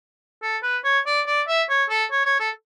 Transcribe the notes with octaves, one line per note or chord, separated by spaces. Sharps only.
A4
B4
C#5
D5
D5
E5
C#5
A4
C#5
C#5
A4